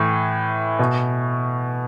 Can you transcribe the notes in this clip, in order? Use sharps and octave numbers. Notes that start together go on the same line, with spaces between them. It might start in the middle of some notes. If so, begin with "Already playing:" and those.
Already playing: A2 E3
B2